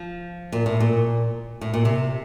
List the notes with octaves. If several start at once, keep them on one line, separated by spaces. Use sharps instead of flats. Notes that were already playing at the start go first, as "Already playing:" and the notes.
Already playing: F3
A#2
A2
A#2
A2
A#2
C3